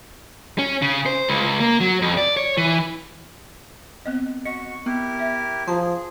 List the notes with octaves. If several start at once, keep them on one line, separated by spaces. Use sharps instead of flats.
C#4
C#3
C5
C#2
A#3
F#3
F2
D5
C#5
E3
B3 C4 D#5
F#4 D#5 C#6 C#7
B3 E4 G4 A#4
E5
F3 G#4 A5 A#5 C6